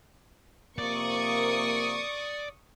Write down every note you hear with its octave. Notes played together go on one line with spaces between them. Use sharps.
C3 F3 A#3 D5 C#6 D#6